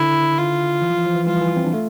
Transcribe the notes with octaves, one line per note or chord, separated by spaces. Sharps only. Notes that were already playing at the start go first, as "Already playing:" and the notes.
Already playing: D3 E4
F4
E3
F3
E3
F3
E3
E3 G3 F4
E3
C4
D4
A3